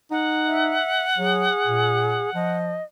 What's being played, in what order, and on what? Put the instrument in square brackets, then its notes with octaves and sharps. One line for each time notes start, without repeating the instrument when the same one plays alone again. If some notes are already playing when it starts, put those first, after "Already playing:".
[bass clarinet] D#4 [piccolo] F#5
[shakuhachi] E5
[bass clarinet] F#3 [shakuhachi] G#4
[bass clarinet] A#2
[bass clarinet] F3 [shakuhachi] D#5